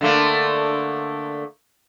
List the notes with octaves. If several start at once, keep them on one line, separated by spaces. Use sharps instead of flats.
D3 A3 A#3